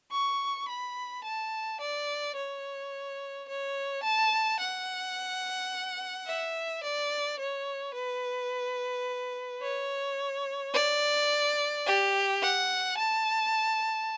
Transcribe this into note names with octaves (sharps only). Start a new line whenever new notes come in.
C#6
B5
A5
D5
C#5
C#5
A5
F#5
E5
D5
C#5
B4
C#5
D5
G4
F#5
A5